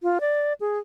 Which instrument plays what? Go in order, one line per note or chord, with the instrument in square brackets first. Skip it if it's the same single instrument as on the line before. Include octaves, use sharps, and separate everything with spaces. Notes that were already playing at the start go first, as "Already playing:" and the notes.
[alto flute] F4
D5
G#4